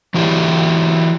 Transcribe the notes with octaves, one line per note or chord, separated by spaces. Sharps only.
E3 F#3 E4 G4